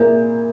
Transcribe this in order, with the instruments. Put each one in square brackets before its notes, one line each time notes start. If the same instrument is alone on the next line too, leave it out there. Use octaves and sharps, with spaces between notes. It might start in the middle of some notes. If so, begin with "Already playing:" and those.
Already playing: [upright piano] A#2 A#3 E4 G#4 [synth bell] A#4